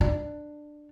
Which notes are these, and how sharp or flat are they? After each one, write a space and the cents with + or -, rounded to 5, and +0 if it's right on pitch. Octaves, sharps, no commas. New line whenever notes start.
D4 +15